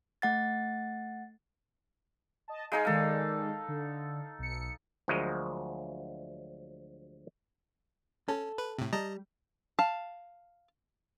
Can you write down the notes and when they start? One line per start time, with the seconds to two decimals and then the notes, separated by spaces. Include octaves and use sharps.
0.22 A3 F#5 A6
2.48 D#5 A5
2.72 G#3 D#4 G#4 F5
2.85 D#3 G#3 A4 D5 F5
3.68 D3
4.39 B1 C#7
5.08 D2 F3 F#3 G#3 A#4 D#5
8.28 C#4 A4
8.58 B4
8.78 A2 C3
8.93 G3 D#5 A5 A#5
9.79 F5 A5